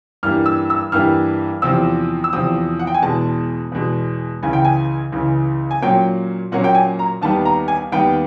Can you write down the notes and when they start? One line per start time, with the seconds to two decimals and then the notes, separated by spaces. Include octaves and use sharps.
0.23 G2 E3 G3 A#3 F6
0.46 E6
0.70 E6
0.92 G2 E3 G3 A#3 F6
1.62 E2 C3 F3 E6
2.24 E6
2.33 E2 C3 F3 D#6
2.79 F#5
2.87 G5
2.94 G#5
3.02 E2 B2 G#3 A5
3.72 E2 B2 G#3
4.42 C#2 C#3 E3 G#5
4.53 G5
4.65 G#5
5.12 C#2 C#3 E3
5.71 G#5
5.82 A#2 F#3 A#3 C#4 G5
6.52 A#2 F#3 A#3 C#4 F#5
6.64 G5
6.75 G#5
6.99 A#5
7.22 D#2 D#3 G3 B3 A5
7.45 A#5
7.68 G#5
7.92 D#2 D#3 G3 B3 G5